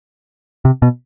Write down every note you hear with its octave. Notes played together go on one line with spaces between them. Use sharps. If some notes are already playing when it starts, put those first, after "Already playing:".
C3
B2